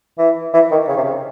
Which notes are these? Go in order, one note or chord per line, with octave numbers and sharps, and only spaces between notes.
E3
E3
D#3
C#3
C3
C#3